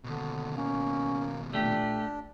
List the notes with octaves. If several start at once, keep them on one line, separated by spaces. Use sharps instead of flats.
D#2 B2 D3
A#3 C#4
A#2 A3 D4 G4